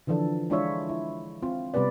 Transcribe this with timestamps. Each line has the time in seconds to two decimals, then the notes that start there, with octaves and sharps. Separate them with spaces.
0.07 D3 E3 F3 D4 A4
0.50 G#3 D4 E4 F4 C#5 E5
0.89 E4
1.43 C4 F4
1.74 C3 G3 B3 G4 B4 D5